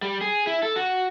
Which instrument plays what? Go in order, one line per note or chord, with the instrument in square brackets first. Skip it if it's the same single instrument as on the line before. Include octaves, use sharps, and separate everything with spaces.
[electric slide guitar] G3
G#4
E4
A4
F#4